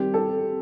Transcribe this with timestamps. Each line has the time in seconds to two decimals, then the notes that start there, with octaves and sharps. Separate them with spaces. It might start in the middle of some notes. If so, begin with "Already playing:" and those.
Already playing: D#3 G3 C4 G4
0.14 A4